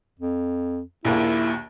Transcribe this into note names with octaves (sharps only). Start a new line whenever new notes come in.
F2
A#1 D#2 A#3 E4